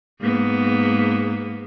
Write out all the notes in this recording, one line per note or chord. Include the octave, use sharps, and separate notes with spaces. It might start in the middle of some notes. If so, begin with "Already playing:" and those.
G#2 A#3 B3